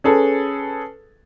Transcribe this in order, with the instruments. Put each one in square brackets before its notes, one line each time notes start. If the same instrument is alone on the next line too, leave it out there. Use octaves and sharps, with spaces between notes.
[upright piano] C#4 G#4 A4 B4